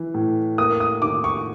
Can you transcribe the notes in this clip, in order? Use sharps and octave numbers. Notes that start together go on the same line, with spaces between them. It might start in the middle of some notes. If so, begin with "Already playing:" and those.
Already playing: E3
A2
A#3 D#6
D#6
D#3 D6
C#6